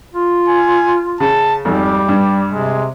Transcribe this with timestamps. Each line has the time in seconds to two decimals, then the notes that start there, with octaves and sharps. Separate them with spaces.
0.13 F4
0.48 G#5
1.20 C#3 A5
1.65 G#1 F2 G3 G4
2.09 G2
2.52 C3 G#3